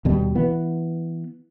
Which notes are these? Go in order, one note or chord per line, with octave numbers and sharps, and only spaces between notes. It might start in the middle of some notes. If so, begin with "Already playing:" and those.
D#2 B2 G3
E3 B3